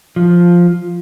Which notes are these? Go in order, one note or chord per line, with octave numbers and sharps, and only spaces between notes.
F3